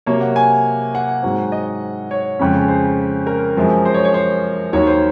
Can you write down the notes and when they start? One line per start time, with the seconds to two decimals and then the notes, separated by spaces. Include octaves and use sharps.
0.06 C3 F#3 A#3 C#5
0.21 F#5
0.36 G#5
0.95 F#5
1.23 G#2 F#3 C4
1.52 D#5
2.11 C#5
2.39 F2 C#3 G#3 C#4
2.68 C5
3.27 A#4
3.56 F#2 F3 G#3 C4
3.85 C5
3.94 C#5
4.05 C#5
4.14 C5
4.73 D#2 D#3 F#3 C#5
4.87 C5